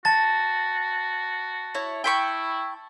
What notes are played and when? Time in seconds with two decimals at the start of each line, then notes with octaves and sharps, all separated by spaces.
0.05 F#4 A5 A6
1.75 E4 C#5
2.04 E4 G5 B5 C#6